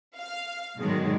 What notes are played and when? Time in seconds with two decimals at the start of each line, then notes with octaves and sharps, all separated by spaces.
0.18 F5
0.81 G#2 B2 D3 D#3 F#3 G#3